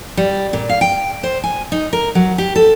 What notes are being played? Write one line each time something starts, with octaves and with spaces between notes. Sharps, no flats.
G3
A#2
F5
G5
C5
G#5
D#4
A#4
F#3
G4
A4